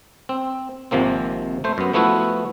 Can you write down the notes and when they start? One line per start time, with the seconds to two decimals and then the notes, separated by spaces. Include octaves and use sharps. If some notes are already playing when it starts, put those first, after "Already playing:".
0.29 C4
0.91 G#1 C3 F3 A#3 C4
1.64 A3 C5
1.78 F#2 B3
1.93 F3 A3 B3 E4 F#4